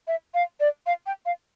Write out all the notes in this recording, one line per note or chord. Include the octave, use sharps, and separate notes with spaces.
E5
F5
D5
F5
G5
F5